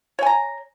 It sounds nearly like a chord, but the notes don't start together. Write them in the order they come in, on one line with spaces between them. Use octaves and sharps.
C#5 G#5 A#5